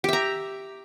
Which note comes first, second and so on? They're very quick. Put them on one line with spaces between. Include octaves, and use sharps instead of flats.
G4 E5 A#5